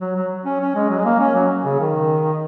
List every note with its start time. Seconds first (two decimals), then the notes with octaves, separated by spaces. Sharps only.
0.01 F#3
0.16 F#3
0.45 C#4
0.60 C#4
0.75 G#3
0.90 F#3
1.00 G#3
1.05 A#3
1.20 C#4
1.35 F#3
1.65 C#3
1.80 D#3